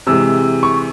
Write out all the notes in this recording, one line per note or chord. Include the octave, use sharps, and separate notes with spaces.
C3 E3 G#3 E6
C#6